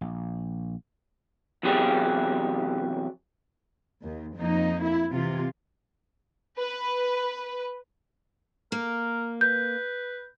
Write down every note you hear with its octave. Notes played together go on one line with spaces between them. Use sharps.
A#1
E2 C3 F#3 G4 G#4
D#2
F2 A#3 D#4
E4
C3 E3 F4
B4
A#3 A#4
B4 G6